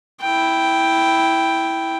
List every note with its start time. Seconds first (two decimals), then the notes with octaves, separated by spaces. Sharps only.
0.21 E4 G5